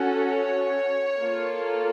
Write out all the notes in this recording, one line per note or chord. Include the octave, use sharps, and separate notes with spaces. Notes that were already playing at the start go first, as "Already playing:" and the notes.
Already playing: C#4 F#4 A4
C#5
A#3 F4 A4